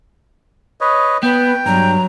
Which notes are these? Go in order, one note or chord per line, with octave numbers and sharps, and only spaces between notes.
B4 C#5 D#5
B3 B4 G5
G2 F#3 A#5